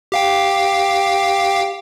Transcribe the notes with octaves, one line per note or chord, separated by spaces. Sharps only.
G4 F5 G5